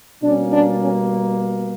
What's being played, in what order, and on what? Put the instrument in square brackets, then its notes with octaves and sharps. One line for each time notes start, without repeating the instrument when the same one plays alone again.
[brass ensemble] B2 G3 A#3 C#4 D4
D4
C#4